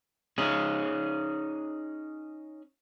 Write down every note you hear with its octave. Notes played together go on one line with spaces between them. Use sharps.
C#4 D#4 G#4